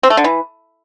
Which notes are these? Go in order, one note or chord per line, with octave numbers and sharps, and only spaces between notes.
C4
A3
D3
E3